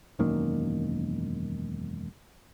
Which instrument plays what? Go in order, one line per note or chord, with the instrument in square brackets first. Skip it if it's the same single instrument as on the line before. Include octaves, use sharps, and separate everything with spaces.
[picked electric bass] E1 F#2 D#3 A#3